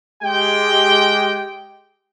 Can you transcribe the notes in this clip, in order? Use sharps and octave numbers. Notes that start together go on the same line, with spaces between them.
G#3 G4 G5